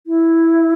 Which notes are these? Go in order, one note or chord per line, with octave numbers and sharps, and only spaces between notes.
E4